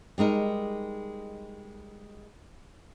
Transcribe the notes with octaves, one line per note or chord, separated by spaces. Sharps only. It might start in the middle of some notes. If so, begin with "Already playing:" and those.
G3 G#3 D#4 A#4